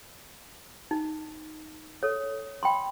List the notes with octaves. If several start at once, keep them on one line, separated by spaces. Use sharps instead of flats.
D#4
A4 C#5
G5 B5 C6